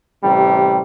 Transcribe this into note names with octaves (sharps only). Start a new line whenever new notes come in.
A1 C3 G3